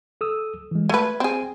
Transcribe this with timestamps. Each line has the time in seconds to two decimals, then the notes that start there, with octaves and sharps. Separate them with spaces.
0.21 A4 D#6 E6
0.71 E3 G#3
0.89 A3 B4 G#6
1.20 C4 G#4